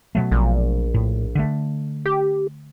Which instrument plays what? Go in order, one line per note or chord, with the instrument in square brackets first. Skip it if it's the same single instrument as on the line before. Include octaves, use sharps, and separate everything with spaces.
[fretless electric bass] B2 F#3 A3
[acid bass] A#1
[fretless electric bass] A2
D3 A3
[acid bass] G4